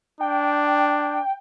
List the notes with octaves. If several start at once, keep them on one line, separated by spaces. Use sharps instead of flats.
D4 G5